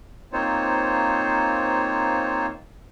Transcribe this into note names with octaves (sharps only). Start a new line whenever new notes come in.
A#3 C4 D#4 F4 C5 C#5